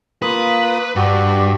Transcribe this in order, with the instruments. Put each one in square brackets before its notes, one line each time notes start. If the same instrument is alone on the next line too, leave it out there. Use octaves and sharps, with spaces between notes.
[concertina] A#3 F4 D#6 [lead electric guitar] B4
[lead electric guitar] G2 [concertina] F#4 G4